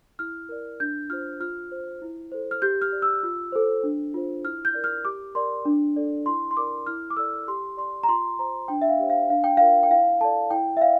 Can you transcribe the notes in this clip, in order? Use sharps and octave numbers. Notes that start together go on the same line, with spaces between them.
E4 F6
A#4 D5
D4 G6
F4 C5 F6
F4 F6
C5
E4
A4 C5
F6
G4 G6
F6
D5
E6
F4
A4 C5
D4
F4 C5
E4 F6
G6
A#4 D5
F6
G4 D6
A#4 D5 C6
D4
A4 D5
E4 C6
C6
A#4 D5 D6
E4 F6
D6
A4 D5 E6
G4 C6
D5 C6
A#5
F4 C6
C5 A#5
D4 G5
E5
F5
G4 C5
F5
D4 F5
G5
F4 A#4 D5 F5
G5
E4 F5
A4 D5 A5
E4 G5
E5
D5 F5